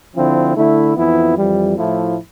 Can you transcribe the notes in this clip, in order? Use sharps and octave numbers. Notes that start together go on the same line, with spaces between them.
D3 F3 C4 E4
D3 A3 E4
F2 E3 B3 E4
F2 E3 G3
A2 F3 A3 E4